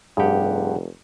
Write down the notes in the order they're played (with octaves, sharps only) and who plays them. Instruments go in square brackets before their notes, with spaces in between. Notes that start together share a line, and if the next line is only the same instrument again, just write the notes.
[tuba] F1 [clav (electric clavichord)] G2 G4 [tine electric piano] G#4 F#5